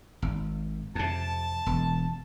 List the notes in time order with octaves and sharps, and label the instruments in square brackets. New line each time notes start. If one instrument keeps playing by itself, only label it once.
[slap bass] G#1
[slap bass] F2 C3 [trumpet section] A5
[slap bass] E1